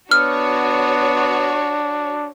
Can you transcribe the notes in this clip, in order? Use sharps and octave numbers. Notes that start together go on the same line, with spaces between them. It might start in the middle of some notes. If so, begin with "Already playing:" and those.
B3 D4 F#4 C#5 F6